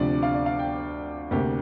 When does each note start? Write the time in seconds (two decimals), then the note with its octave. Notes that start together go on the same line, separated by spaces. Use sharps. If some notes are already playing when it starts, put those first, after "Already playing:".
Already playing: D2 C3 F3 D4 D5
0.23 F5
0.34 D5
0.46 F5
0.59 G5
1.31 D2 C3 A#3 D4 G4